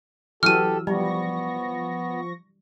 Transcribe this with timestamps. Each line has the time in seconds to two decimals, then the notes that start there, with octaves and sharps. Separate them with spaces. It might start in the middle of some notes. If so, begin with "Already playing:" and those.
0.43 E3 F#3 G4 A4 E6 F6 D#7
0.87 F3 G3 B3 C#6 A#6